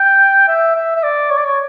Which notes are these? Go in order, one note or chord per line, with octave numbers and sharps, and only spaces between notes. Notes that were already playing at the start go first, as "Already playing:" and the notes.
Already playing: G5
E5
E5
E5
D5
C#5
D5
C#5